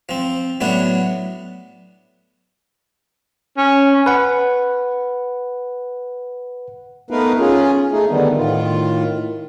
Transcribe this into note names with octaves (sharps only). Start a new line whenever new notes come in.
F3 C4
A2 F#3 B3 D4
C#4
B4 F#5
A3 B3 D#4 A#4 B4 F5
C#4 F4 G#4
A3 D#4 G#4
D3 D#3 G3 B3
A2 D#3 F4